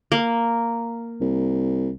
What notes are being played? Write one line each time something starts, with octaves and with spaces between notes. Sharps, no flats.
A#3
C2